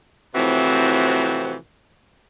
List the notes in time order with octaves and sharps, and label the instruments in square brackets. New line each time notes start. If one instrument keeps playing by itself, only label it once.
[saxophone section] A2 C3 E3 F3 C4 F#4